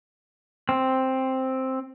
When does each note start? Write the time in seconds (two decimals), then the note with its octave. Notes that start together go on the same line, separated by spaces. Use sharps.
0.69 C4